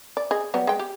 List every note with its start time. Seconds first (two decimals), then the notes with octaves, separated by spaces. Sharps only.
0.17 D5
0.31 G#4 D#5
0.54 F#3 G3 B3
0.67 G#3 G5
0.79 G4